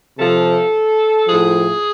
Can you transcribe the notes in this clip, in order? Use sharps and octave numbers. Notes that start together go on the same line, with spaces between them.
C3 F3 A4
A2 F3 G#4